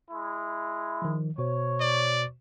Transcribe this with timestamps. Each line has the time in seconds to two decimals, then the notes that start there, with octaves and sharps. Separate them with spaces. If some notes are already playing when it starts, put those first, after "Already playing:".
0.10 G#3 E4
1.02 D#3 F3
1.38 B2 F#4 C5 C#5
1.81 D5